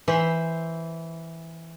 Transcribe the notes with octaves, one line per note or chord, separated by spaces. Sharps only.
E3 C5 E5 B5